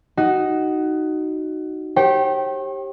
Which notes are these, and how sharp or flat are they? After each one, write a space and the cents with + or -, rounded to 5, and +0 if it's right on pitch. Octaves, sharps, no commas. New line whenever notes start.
D#4 +0 F#4 +15
G4 +0 C#5 -45 G5 -20